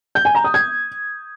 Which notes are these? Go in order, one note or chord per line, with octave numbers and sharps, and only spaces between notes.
G6
G#5
A#5
D#6
G#6